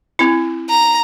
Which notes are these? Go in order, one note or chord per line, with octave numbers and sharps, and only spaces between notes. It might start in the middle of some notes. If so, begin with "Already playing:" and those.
C4 E4
A#5